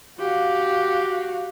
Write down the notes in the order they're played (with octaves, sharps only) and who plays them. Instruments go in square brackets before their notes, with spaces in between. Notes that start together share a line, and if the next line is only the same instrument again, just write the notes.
[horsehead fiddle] F#4 F5 [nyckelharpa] G4